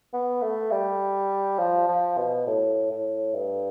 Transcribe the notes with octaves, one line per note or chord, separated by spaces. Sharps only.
B3
A3
G3
F3
F3
B2
A2
A2
G2